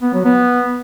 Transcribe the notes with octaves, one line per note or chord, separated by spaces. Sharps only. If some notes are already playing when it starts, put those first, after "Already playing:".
B3
F#3
B3